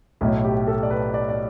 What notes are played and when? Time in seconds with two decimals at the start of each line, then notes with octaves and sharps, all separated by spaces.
0.21 B1 A2 A3 E4
0.44 G4
0.68 A4
0.83 D5
0.90 B4
1.14 D5
1.29 D5